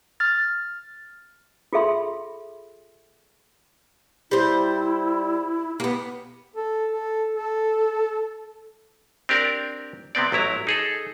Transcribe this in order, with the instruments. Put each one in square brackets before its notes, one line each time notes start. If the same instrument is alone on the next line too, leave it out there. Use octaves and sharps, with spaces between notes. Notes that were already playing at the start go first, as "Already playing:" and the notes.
[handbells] F6 A6
[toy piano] F4 G#4 A4 E5 B5 C6
[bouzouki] G3 C5 [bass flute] E4
[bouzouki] A#3 B3 [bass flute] G4
[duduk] A4
A4
A4
[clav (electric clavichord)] C4 D4 G4 A#4 D5
C3 B3 C4 D5
A1 F#3 E4 A#5
D#4 G#4 A4